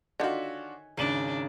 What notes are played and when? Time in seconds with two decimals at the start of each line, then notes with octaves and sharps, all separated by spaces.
0.20 D3 D#3 D4 F4 F#4 C#5 E5 G#5
0.97 G#1 C#3 D4 D#4 F#7